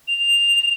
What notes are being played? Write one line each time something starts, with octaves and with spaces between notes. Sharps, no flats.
F7